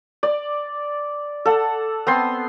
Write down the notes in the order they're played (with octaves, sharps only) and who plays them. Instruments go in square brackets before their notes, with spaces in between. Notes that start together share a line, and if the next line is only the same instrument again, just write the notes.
[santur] D5
A4 F#5
B3 C4 C6